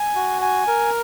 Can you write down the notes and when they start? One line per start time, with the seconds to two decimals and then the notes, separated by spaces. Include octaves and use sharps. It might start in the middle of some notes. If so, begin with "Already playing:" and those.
Already playing: G#5
0.15 F#4
0.42 G#5
0.67 A#4